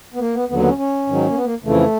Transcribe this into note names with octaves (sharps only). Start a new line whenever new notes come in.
B3
A#3
B3
D#2 D3 F#3 B3
B3
C#4
C#4
G#2 D#3 F#3
A#3
B3
A#3
F2 C#3 E3 A3